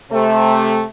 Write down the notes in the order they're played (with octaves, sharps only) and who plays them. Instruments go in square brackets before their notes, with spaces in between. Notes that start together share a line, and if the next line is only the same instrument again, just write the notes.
[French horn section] C3 A3